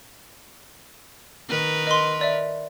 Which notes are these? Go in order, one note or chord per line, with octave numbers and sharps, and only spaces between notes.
D#3 A#4 B4
D#5 C6
D5 E5